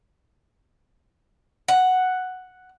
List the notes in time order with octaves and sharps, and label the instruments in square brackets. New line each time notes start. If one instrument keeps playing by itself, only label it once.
[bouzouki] F#5